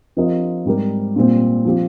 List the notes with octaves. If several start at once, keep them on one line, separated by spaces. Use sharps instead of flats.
F3 C4 G4 A#4 D#5
G#2 G3 C4 G4 A#4
A#2 G3 C4
F3 C4 G4